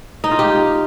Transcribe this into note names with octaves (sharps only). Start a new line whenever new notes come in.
D#4
F4
G4